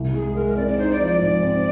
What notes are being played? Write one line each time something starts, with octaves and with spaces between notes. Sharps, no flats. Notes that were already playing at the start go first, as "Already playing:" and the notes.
Already playing: C2
G#3 G#4
G#3 A#4
A#4
C4 D5
D5
D#4 C5
D5
F3
D5
G#2 D5
C4